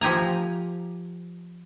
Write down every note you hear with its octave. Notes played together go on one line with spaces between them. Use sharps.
F3 G4 G#5 A#5